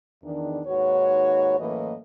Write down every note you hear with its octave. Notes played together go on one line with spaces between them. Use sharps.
E2 D#3 D4
D#2 G#2 F#4 B4 C#5
F#2 A2 E3 A#3 B4 D#5